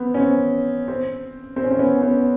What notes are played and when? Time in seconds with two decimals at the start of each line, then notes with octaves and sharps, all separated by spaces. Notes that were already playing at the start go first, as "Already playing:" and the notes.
Already playing: B3 C4
0.14 C#4
0.20 C4
0.88 C4
1.56 C4
1.64 C#4
1.71 C4
1.79 B3 C#4
2.02 B3 C#4